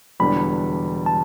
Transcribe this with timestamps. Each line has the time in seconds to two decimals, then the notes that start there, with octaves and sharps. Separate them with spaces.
0.20 E1 E2 D3 G3 B3 B5
1.06 A5